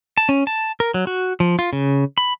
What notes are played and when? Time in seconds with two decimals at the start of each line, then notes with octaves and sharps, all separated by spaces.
0.18 A5
0.29 C#4
0.47 A5
0.80 A#4
0.94 F#3
1.07 F#4
1.40 F3
1.59 F4
1.73 C#3
2.18 B5